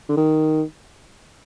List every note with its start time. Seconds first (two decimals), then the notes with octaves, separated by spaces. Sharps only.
0.09 D3
0.17 D#3